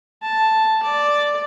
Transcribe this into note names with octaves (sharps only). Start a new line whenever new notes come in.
A5
D5